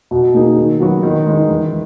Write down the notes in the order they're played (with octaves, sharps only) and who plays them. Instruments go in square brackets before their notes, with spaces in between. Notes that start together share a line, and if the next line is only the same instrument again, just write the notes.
[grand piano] B2
A#3 D#4 G#4
D#3
F#3 B3 F#4
D#3
G#3 D#4
E3